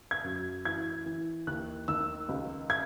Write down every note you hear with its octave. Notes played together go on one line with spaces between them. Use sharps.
G#6
F#2
E3 G#6
E3
D#2 F#6
D#3 E6
C#2
G#6